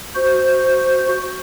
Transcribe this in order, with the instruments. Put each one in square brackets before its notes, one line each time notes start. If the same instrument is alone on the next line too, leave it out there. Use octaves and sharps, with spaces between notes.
[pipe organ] F#4 C5